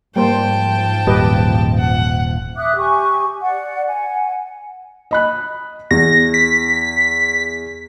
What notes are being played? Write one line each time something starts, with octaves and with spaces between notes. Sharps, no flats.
G#2 F3 G3 A#3 C5 G5 A5
D#1 G4 B4 D#5
F#5
E5 D6 D#6 F#6
G4 G#5 C#6
D5 F#5
F#5 G#5
D#5 B5 F#6
E2 A#6
B6